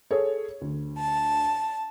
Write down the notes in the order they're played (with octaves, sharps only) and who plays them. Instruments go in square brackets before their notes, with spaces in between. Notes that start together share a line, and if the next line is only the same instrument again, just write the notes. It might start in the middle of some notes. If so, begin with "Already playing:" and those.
[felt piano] G#4 A4 C#5
D2
[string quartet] A5